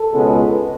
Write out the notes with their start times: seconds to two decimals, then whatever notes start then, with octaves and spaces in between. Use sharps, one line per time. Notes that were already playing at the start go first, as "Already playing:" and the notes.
Already playing: A4
0.12 C#2 B2 G#3 B3